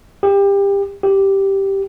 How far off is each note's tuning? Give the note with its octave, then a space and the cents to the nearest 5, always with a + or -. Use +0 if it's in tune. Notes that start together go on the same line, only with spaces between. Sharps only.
G4 +25
G4 -5